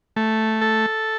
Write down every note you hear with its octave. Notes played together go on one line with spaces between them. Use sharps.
A3
A4